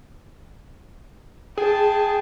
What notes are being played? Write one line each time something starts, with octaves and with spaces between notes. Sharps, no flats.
G#4 G5 A5